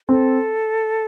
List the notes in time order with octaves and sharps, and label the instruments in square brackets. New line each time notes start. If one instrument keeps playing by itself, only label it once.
[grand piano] C4 [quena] A4